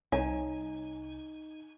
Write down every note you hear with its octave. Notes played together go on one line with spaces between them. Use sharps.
C2 D#4 C#5 G#5